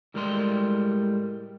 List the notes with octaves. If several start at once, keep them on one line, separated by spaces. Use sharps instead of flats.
A2 G3 G#3 A#4 B5 C6